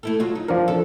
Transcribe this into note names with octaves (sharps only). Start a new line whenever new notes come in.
A3 E4 A4
F#3 F4
D#4
G2 F3 D4 A#4
A4